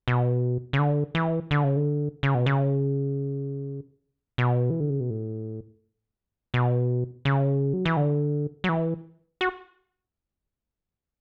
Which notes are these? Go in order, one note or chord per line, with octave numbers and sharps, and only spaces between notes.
B2
C#3
D3
E3
D3
C#3
D3
C#3
B2
C#3
B2
E3
D3
C#3
B2
A2
B2
C#3
F#3
E3
D3
F#3
E3
F#4